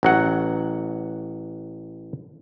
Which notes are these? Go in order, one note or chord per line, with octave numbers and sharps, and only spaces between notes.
A1 F#3 F#5